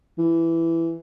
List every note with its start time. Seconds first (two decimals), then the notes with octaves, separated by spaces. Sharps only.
0.18 E3